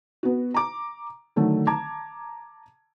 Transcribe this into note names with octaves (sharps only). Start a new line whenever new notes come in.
B3 F#4
A#5 D6
D3 D#3 F#3 A3
A5 A#5 D6 G#6